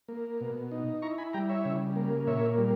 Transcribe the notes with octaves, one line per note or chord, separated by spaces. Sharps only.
A#3
B2
D#4
E4 A#5 C#6
G#5 B5
G3 G5 A#5
C#5 E5
C#3
A#3
A#2 C#5 E5
G3